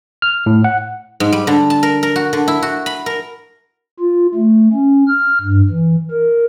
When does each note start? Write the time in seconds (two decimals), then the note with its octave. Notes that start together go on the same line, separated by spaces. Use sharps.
0.22 F6
0.46 A2
0.64 F#5
1.20 G#2
1.32 G3
1.47 D3
1.70 A5
1.83 A#4
2.03 A#4
2.16 F#4
2.33 D3
2.48 E4
2.63 F#4
2.86 B5
3.06 A#4
4.00 F4
4.35 A3
4.73 C#4
5.07 F6
5.41 G2
5.70 E3
6.11 A#4